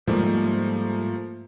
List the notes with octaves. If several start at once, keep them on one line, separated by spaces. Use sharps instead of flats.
G#2 F3 G3 A3 A#3